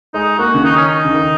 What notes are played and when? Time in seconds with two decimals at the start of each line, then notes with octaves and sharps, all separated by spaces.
0.14 G#3 D#4
0.39 A#3 F#4
0.54 C#3
0.64 D#3 D#4
0.76 C#4
0.88 D#4
1.05 C#3
1.14 D#3